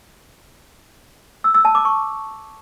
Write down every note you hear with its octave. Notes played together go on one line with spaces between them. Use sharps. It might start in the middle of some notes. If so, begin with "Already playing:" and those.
E6
E6
A5
D6
C#6